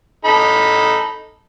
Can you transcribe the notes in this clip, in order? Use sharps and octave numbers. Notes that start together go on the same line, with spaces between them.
D#4 A4 B5